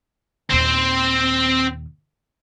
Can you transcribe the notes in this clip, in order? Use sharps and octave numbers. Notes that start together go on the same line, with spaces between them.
D#2 A#2 C4 C5